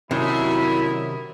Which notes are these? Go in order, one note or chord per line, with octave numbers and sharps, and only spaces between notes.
F#2 C3 D#3 F#3 E4